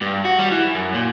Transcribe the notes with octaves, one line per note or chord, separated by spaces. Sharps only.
G2
F#4
G3
E3
F#2
A#2